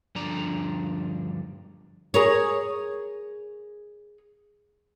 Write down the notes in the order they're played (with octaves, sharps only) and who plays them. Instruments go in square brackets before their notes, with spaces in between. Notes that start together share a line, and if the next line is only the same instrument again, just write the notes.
[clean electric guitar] G2 D3 F3 D4 D5 A#5
[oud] G#4 A#4 C#5